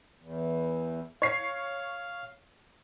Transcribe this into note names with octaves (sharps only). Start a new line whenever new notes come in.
E2
C#5 F5 C7